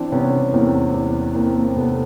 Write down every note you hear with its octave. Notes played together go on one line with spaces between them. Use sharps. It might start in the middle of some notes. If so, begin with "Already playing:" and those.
Already playing: E3 C4 D4
C3 B3 C#4
E2 A#3 C4
E2
E3 A#3 C4
A#3 C4
C3 A3 B3